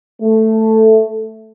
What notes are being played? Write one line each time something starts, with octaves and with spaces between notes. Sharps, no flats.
A3